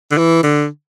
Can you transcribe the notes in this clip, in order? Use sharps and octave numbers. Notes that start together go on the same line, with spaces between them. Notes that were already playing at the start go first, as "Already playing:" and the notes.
D3
E3
D3